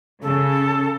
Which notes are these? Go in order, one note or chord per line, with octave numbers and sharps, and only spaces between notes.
C#3 A4